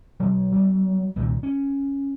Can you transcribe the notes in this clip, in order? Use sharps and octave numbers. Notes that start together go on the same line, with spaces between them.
B2 F#3
F#3 G3 B3
C2 A#2 D#3
C#4